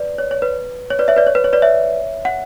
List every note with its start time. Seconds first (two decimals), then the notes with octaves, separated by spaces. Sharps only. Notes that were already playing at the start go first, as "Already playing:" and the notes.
Already playing: B4 D5
0.18 C#5
0.31 C#5
0.42 B4
0.90 C#5
0.99 B4 D5
1.08 C#5 E5
1.16 B4 D5
1.27 C#5
1.35 B4
1.44 C#5
1.53 B4 D5
1.62 C#5 E5
2.25 F#5